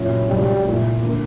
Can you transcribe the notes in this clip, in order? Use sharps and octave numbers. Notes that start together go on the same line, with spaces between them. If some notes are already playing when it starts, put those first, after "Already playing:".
Already playing: A#2 F#3 C#4 E4
A#1 A#2 F#3 G3
A#2 A#3 E4
D3 A#3